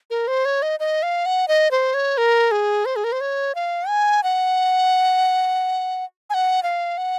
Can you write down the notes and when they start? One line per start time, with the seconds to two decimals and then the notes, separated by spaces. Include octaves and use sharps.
0.10 A#4
0.28 C5
0.45 C#5
0.62 D#5
0.80 D#5
1.03 F5
1.26 F#5
1.48 D#5
1.71 C5
1.94 C#5
2.18 A#4
2.51 G#4
2.85 C5
2.96 G#4
3.04 A#4
3.12 C5
3.21 C#5
3.55 F5
3.88 G#5
4.23 F#5
6.30 G#5
6.34 F#5
6.63 F5
6.98 F#5